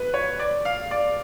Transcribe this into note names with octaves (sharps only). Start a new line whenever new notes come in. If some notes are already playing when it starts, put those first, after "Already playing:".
Already playing: B4
C#5
D5
F5
D5